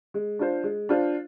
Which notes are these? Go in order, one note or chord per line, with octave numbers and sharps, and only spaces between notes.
G#3
D4 F4 C5
G#3
D4 F4 C5